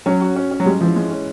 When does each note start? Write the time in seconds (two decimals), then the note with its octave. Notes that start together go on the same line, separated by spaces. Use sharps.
0.06 F#3 C#4
0.21 F#4
0.36 C#4
0.51 C#4
0.60 F#3
0.66 G3 G#3
0.81 E3 F3
0.96 G#3
1.11 C#4